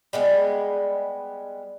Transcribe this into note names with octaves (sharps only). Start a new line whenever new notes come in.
G3 G#3 B3